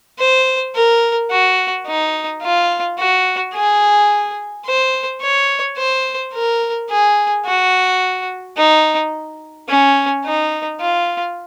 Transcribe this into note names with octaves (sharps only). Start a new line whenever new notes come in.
C5
A#4
F#4
D#4
F4
F#4
G#4
C5
C#5
C5
A#4
G#4
F#4
D#4
C#4
D#4
F4